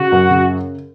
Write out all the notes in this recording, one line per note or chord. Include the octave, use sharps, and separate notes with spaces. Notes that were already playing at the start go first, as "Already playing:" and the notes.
Already playing: C#3 F#4
F#2
C#3